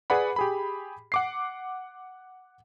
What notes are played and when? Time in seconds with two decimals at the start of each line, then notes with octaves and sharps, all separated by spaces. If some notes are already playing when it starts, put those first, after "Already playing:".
0.10 G#4 B4 D5 F#5 B5
0.36 G4 G#4 B5
1.12 F#5 D6 C7